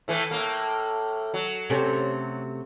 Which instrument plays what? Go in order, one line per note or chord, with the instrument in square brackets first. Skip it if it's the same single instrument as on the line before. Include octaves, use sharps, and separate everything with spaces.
[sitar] A2 E3 A3
A2 A#3
F#3
[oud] C3 A3 C#4